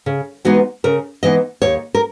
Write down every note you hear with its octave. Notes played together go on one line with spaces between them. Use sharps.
C#3
E3 G#3 B3 D#4 F#4
C#3 A#4
E3 G#3 B3 D#4 D#5
D#2 C#5
A#4